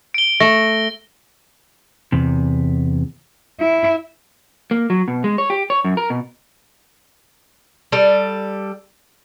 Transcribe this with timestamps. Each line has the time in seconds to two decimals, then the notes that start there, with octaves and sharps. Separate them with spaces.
0.14 D7 G7
0.40 A3 A#6
2.12 E2 C3
3.60 E4
4.71 A#3
4.90 F#3
5.08 B2
5.24 G#3
5.38 C#5
5.50 G4
5.70 C#5
5.84 F#2
5.97 A#4
6.10 B2
7.92 G3 A4